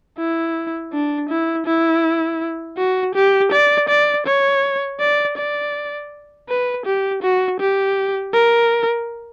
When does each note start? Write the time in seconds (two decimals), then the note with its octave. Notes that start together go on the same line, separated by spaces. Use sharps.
0.18 E4
0.92 D4
1.30 E4
1.66 E4
2.78 F#4
3.15 G4
3.52 D5
3.89 D5
4.26 C#5
5.00 D5
5.37 D5
6.49 B4
6.86 G4
7.23 F#4
7.60 G4
8.34 A#4